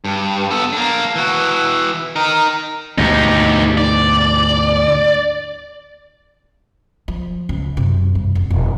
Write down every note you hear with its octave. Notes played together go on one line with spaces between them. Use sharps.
G2
B3 A4
A#3 D4
E3 F#4
D#4 A#4
D2 G#2 B2 D#4 G4
D5
F3
C#2
F#2 C3
G2
F1
E1